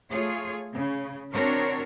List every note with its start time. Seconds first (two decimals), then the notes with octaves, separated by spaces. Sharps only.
0.11 A3 F4 G#4 C#5
0.75 C#3
1.33 C4 D4 F#4 A#4 C#5